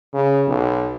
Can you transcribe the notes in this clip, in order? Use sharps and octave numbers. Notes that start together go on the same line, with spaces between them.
C#3
B1